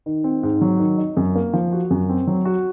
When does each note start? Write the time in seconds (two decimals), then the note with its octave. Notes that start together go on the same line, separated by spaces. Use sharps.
0.06 D#3
0.24 C4
0.43 G#2
0.61 F#3
0.80 D#3
0.98 D#4
1.17 F#2
1.35 A#3
1.53 F3
1.72 F#4
1.91 F#2
2.09 C4
2.27 F#3
2.45 F#4